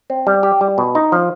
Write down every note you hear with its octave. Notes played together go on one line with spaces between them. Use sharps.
C4
G3
G4
G3
B2
D#4
F3